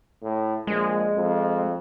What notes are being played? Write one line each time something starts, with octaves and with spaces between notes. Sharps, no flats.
A2
A#1 G#3
F2